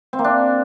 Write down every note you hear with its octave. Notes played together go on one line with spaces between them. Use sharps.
C4
A#3
D4